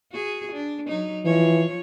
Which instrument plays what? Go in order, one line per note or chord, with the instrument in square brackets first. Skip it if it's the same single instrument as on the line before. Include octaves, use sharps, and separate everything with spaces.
[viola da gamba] F#4 G#4
D4
F#3 D#4
[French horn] E3 [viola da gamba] F3 C#5